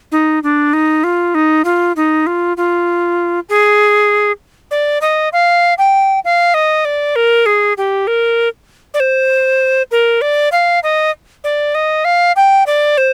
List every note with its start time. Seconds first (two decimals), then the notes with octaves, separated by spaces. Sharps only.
0.12 D#4
0.43 D4
0.73 D#4
1.04 F4
1.35 D#4
1.65 F4
1.96 D#4
2.27 F4
2.57 F4
3.49 G#4
4.71 D5
5.01 D#5
5.33 F5
5.78 G5
6.25 F5
6.54 D#5
6.85 D5
7.16 A#4
7.46 G#4
7.77 G4
8.07 A#4
8.94 D5
9.00 C5
9.91 A#4
10.21 D5
10.52 F5
10.83 D#5
11.44 D5
11.75 D#5
12.05 F5
12.36 G5
12.66 D5
12.97 C5